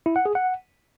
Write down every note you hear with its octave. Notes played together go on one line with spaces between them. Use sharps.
E4
F#5
G#4
F#5